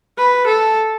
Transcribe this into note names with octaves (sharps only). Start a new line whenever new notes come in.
B4
A4